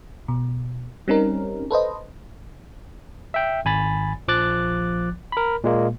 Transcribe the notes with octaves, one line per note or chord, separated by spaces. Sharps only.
B2
G3 C4 C#4 D#4 A#4
A4 B4 C5 D#5
E5 G5
G#1 G#5 B5 A6
A#1 F3 D6 F#6 A6
A#4 B5
A#2 G#3 A#3